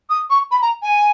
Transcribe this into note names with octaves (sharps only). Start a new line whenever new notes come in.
D#6
C#6
B5
A#5
G#5